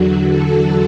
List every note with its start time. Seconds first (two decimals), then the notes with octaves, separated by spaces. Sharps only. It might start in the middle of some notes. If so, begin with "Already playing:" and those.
Already playing: E2 D3 F#3 F#4
0.27 F#4 A4